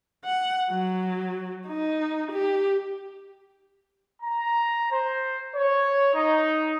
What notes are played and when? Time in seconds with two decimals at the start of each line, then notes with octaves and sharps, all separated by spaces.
0.25 F#5
0.71 F#3
1.67 D#4
2.32 G4
4.22 A#5
4.92 C5
5.55 C#5
6.15 D#4